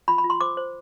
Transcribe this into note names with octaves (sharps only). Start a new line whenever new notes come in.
F4 B5
B5
F4
C6
C5 D6
C5